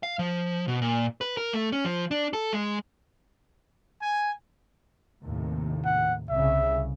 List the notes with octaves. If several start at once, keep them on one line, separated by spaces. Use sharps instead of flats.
F5
F3
B2
A#2
B4
A#4
A3
C#4
F3
D4
A4
G#3
G#5
D#2 A2 C3
F#5
C2 C#3 E5